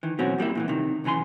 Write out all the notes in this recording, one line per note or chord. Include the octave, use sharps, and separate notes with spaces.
D#3 E3
B2 F#3 C4 C#4 F#4
A#2 G3 A#3 E4
A#2 D#3 E3
C3 D#3
B1 C#3 E3 G#5 C6